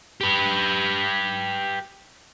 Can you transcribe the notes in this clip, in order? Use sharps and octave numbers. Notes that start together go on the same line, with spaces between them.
G4 B4